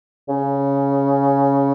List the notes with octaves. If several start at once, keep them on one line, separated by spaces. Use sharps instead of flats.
C#3